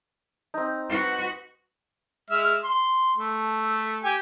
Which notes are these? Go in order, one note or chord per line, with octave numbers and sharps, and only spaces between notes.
C4 D#4
F#4 B4
G#3 E5 F6
C6
A3
G4 G#5